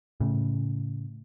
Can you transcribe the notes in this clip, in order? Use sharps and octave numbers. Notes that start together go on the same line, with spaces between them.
A2 C#3